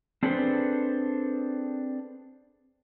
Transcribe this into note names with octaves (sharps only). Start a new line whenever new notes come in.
C4 D4 G#4 A4 B4 C5